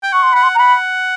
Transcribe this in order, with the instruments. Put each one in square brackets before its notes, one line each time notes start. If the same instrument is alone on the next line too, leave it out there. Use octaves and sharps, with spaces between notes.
[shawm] G5
[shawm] F#5 [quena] C#6
[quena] C6
[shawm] F#5 [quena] B5
[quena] C6
A#5
[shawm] F#5 [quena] B5